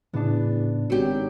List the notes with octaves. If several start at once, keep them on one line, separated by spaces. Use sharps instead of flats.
E2 A2 C#3 B3 D4
G#1 F#3 G4